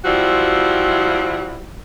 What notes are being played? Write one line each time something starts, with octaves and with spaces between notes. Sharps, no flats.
F3 G3 C4 E4 F#4